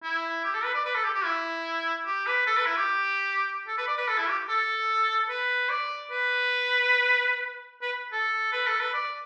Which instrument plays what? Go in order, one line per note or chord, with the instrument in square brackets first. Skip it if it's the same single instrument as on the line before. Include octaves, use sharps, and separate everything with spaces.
[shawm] E4
G4
A4
B4
D5
B4
A4
G4
G4
E4
G4
B4
A4
B4
E4
G4
A4
B4
D5
B4
A4
E4
G4
A4
B4
D5
B4
B4
A4
B4
A4
B4
D5